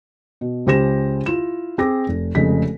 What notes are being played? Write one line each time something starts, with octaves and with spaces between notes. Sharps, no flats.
B2
C#2 C#3 G4 C5 A#6 E7
E4 F4 E7
C4 G#4 D6 A#6
F1
F1 F2 C#3 G#3 B6